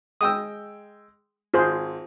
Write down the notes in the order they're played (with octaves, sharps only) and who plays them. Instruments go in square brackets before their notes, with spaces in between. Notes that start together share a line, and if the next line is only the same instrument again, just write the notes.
[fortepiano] G#3 G5 E6 [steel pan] D#6
[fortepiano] G#1 [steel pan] F4 G#4 C5